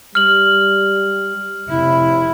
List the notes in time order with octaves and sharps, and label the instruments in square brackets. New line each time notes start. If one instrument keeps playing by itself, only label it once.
[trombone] G3 [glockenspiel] F6 F#7
[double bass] F1 E4 [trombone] C3